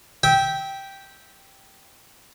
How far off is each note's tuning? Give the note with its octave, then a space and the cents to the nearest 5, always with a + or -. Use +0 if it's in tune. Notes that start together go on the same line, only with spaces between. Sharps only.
E5 -25 G5 -5